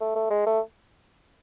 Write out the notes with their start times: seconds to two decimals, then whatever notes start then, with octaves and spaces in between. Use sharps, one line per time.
0.01 A3
0.15 A3
0.30 G#3
0.46 A3